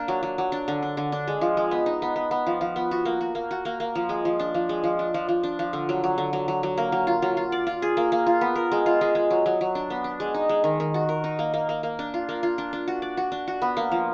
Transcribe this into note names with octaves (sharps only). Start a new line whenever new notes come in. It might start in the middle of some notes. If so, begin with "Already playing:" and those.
Already playing: A#3 D4
F#3
F#3
F#3
D4
D3
D4
D3
D4
G#3
F3
G#3
B3
D#4
B3
B3
B3
F3
F3
B3
F#4
A#3
F#4
A#3
F#4
A#3
A#3
F3
G#3
F3
D4
F3
G#3
F3
D4
F3
F3
D4
F3
D3
F#3
F#3
D3
F#3
F#3
F#3
A#3
F#3
F4
F#3
F4
D5
F4
G#4
A#3
A#3
F4
B3
A#4
G#3
F4
G#3
G#3
F#3
F#3
F#3
D4
B3
D4
G#3
D#4
G#3
D#3
D#3
F#4
A#4
D#4
A#3
A#3
A#3
A#3
D4
F4
A#3
F4
D4
D4
F#4
D5
F#4
D4
F#4
B3
A#3
F3